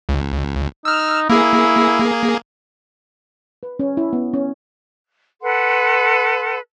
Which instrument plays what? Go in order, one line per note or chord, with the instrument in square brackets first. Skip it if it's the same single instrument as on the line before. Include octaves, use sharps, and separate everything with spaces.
[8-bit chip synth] C#2
[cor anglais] D#4 [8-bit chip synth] E6 F6
[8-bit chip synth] A#3 G#4 [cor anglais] E4
[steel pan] B4
C#4
E4
B3
C#4
[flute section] A4 B4 F#5 C6